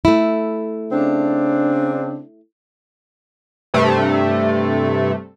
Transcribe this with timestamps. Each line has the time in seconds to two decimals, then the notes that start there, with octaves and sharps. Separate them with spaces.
0.05 A3 E4
0.92 C#3 C4 D4
3.74 G2 C3 A3